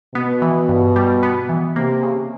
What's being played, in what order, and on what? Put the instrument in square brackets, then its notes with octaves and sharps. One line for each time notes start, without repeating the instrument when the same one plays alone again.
[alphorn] B2 [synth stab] B3
[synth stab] E3
G2
G3
B3
E3
[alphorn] C3 [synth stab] A#3
[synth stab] C#3